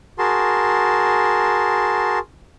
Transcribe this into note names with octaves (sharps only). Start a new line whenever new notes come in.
F#4 G#4 A#4 A5 C6